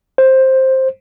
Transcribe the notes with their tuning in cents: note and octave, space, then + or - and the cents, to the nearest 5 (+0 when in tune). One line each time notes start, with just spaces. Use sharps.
C5 +10